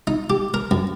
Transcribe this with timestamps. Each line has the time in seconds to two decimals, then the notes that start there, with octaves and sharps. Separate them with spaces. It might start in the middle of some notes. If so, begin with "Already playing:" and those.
0.07 D#4
0.30 G4
0.54 A#4
0.71 F#2